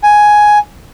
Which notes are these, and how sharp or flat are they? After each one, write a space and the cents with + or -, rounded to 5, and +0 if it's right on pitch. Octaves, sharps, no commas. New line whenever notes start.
G#5 +5